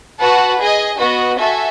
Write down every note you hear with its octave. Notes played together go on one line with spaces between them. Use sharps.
F#4 B4 F#5 A5
G#4 D#5 G#5
B3 F#4 B4 D#5
F#4 A4 E5 G#5